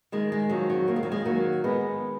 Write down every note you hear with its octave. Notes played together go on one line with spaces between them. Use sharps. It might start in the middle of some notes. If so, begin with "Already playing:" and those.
D#3 G#3
G#3
F2 F#3
F#3
D#3 A#3
G#3
F#3
G#3
D#3 F#3 A#3
D#3 G#3 B3